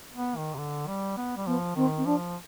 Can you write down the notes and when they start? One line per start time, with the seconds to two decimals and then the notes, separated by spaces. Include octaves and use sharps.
0.14 B3
0.36 D#3
0.54 C3
0.58 D3
0.88 G3
1.17 B3
1.36 G3
1.47 F3 B3
1.76 D#3 C4
1.97 C4
2.05 F3 D4